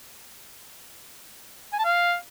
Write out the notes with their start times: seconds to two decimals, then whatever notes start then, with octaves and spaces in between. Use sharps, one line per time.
1.73 G#5
1.79 A5
1.85 F5